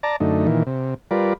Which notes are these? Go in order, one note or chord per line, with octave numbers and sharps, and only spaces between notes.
D5 A5 A#5
F#2 D3 A3 D#4
A#2 D#3 E3
C3
G3 F4 A#4 B4 D5